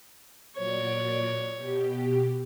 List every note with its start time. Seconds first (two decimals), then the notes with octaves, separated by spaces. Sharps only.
0.57 A#2 F#3 C#5 D5
1.56 B2 G4